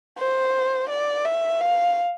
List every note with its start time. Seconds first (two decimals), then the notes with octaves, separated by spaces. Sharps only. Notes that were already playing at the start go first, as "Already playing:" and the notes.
0.18 C5
0.89 D5
1.25 E5
1.61 F5